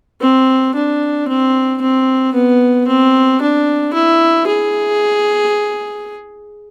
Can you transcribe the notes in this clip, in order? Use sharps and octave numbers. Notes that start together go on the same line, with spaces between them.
C4
D4
C4
C4
B3
C4
D4
E4
G#4